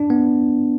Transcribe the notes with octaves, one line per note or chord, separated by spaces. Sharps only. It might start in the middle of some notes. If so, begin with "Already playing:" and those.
Already playing: D4
B3